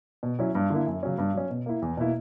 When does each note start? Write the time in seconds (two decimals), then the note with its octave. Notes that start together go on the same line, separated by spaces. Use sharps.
0.23 B2
0.39 F#3 C#4 E4
0.55 G2
0.70 D3 A#3 E4
0.87 F#2
1.03 C#3 F#3 C#4
1.18 G2
1.34 F#3 C#4
1.50 B2
1.66 A#3 E4
1.82 E2
1.97 B2 A#3 E4